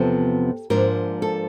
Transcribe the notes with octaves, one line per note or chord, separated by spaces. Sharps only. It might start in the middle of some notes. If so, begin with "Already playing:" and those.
Already playing: E2 C3 F3 B3 A4
G#2 F3 A#3 D4 A#4
A4